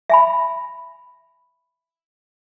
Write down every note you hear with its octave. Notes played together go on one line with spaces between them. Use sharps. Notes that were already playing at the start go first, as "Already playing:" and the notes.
E5 G#5 B5